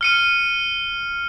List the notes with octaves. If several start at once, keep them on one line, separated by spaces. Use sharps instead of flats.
F6 C#7 D#7